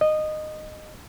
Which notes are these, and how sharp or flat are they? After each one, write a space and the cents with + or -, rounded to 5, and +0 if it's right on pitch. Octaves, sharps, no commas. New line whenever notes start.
D#5 -15